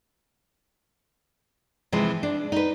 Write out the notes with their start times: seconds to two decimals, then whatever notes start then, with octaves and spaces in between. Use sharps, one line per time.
1.92 C3 E3 F3 G#3
2.23 D4
2.52 D#4 B4